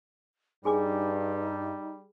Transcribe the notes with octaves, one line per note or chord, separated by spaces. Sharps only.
G2 G3 D#4 G#4 G#5 D6